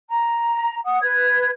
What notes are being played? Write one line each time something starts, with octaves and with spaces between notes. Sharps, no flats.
A#5
F#5 D#6
B4 G#6